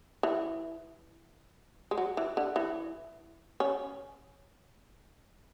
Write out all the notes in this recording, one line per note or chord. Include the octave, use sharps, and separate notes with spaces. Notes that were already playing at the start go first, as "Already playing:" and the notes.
E3
G#3
F#3
E3
D3
E3
C#4